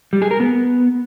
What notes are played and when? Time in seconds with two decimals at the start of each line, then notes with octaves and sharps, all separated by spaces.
0.13 G3
0.22 G#4
0.31 A#4
0.40 B3